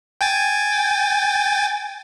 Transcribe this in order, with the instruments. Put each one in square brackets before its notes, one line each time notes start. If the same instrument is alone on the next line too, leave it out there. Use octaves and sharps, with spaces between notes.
[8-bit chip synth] G5 G#5 A6